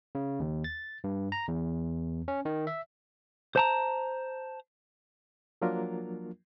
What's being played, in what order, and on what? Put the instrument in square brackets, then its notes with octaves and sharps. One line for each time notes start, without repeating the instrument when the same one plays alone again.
[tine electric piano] C#3
D#2
A6
G2
A#5
E2
C#4
D#3
E5
[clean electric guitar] C5 A5 A#5
[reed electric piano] F3 F#3 A#3 D4 F4 A#4